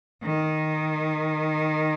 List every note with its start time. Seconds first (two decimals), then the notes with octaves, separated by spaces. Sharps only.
0.23 D#3